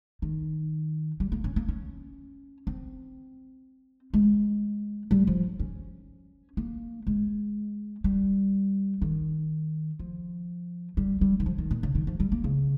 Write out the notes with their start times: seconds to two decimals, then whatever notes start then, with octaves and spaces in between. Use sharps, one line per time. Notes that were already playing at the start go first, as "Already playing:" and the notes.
0.22 D#3
1.20 G3
1.32 A#3
1.44 C#4
1.56 A#3
1.68 C#4
2.67 C4
4.14 G#3
5.11 G3
5.27 F3
5.60 C#4
6.57 A#3
7.07 G#3
8.04 G3
9.02 D#3
9.99 F3
10.97 G3
11.21 G3
11.40 D#3
11.46 F3
11.58 D#3
11.71 A#2
11.83 C#3
11.95 D#3
12.07 F3
12.20 G3
12.32 A#3
12.44 C#3